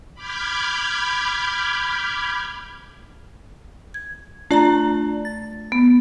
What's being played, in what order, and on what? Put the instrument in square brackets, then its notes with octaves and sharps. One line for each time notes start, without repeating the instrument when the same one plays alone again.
[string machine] B5 D6 F6 G6 G#6
[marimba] G#6
[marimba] A3 A#5 [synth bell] D4 F4 D5
[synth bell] A6
[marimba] B3